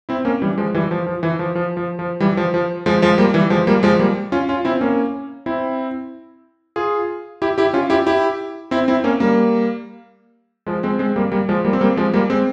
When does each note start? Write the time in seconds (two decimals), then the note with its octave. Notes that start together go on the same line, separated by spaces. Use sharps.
0.09 C4 E4
0.25 A#3 C#4
0.42 E3 G3
0.58 F3 G#3
0.74 E3 G3
0.91 F3
1.06 F3
1.23 E3
1.39 F3
1.55 F3
1.77 F3
1.99 F3
2.20 E3 G3
2.37 F3
2.54 F3
2.86 F3 G#3
3.02 F3 G#3
3.18 G3 A#3
3.34 E3 G3
3.50 F3 G#3
3.67 G3 A#3
3.83 F3 G#3
3.99 G3 A#3
4.32 C#4 F4
4.49 C#4 F4
4.65 C4 E4
4.81 A#3 C#4
5.46 C4 E4
6.76 F4 G#4
7.42 E4 G4
7.58 E4 G4
7.73 C#4 F4
7.90 E4 G4
8.07 E4 G4
8.71 C4 E4
8.88 C4 E4
9.04 A#3 C#4
9.20 G3 A#3
10.66 F3 G#3
10.83 G#3 C4
10.99 G#3 C4
11.16 G3 A#3
11.32 G3 A#3
11.49 F3 G#3
11.64 G3 A#3
11.73 C4
11.81 G3 A#3
11.97 F3 G#3
12.13 G3 A#3
12.30 G#3 C4